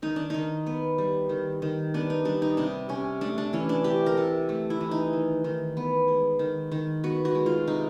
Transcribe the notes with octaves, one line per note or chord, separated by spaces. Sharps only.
D#3 D#4
D4
D#3 D#4
B3
G3
D#3
D#3
B3 D4
D#4
G3 D4
D#4
C3 D4
C3 C#4
A3 D4
D4
E3 C#4
D4
C3 G4
A#4
C3 A4
A3
E4
E3
D#4
D#3
D#3
B3
G#3
D#3
D#3
B3 F#4
F#4
G#3
F4
C3 D#4